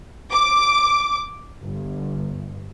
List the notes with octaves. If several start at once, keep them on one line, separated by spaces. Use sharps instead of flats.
D6
G1